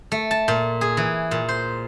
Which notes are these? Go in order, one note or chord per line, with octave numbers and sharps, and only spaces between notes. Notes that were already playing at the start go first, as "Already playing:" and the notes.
A3
A5
A#2
G#4
E3
A#2
C5